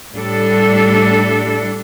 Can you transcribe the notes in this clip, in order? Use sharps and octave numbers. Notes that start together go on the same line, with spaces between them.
A2 G3 D4 A4